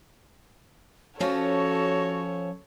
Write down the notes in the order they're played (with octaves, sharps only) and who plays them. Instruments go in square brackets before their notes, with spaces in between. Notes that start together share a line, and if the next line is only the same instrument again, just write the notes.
[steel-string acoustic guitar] F3 C#4 [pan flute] F#4 [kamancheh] A4 C#5